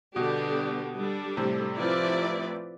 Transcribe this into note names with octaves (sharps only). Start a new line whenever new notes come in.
B2 D3 G3 B3 D4 G4
G3 D4 A4
A2 C3
F3 C4 E4 B4 D5